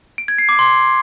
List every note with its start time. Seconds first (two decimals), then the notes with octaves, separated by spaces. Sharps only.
0.18 D7
0.28 G#6
0.38 C7
0.49 D6
0.59 C6